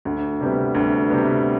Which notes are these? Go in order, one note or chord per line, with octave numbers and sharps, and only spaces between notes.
D2
C3 G3 B3
D2
C3 G3 B3